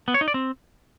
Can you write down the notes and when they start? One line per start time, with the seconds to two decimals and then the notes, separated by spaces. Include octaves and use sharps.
0.08 B3
0.14 C#5
0.21 D#4
0.28 D5
0.34 C4